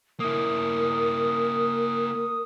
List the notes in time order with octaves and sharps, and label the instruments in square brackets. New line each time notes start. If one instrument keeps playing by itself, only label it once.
[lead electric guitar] A#3 E4 [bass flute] A#4 [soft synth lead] D#6